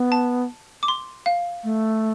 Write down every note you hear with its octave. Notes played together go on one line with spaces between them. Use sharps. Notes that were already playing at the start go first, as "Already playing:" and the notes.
Already playing: B3
A5
D6
C6
F5
A3